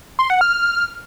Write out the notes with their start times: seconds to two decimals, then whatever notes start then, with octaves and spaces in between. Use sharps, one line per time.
0.19 C6
0.30 F#5
0.41 F6